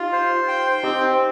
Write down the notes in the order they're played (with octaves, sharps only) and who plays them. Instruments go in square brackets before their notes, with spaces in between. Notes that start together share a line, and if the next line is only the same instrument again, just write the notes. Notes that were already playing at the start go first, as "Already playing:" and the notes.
Already playing: [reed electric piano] D#4 G4 [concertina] F4
[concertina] C5
G5
[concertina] C4 [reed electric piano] D#4 G4